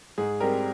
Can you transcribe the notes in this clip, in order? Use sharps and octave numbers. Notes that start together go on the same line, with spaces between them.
G#2 G#4
G3 C4 A#4